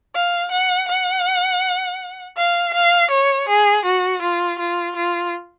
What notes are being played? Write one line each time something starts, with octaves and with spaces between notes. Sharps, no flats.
F5
F#5
F#5
F5
F5
C#5
G#4
F#4
F4
F4
F4